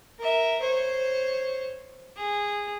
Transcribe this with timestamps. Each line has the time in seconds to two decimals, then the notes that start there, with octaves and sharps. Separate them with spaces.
0.19 A#4 E5
0.61 C5 C#5
2.16 G#4